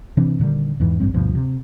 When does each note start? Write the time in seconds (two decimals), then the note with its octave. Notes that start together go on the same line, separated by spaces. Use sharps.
0.17 C3 E3 C4 D4
0.40 A#2 D3 D#3 G3
0.80 E2 G#2 E3
1.00 A1 G2 G3 C4
1.14 D2 G2 B2 F3
1.35 C3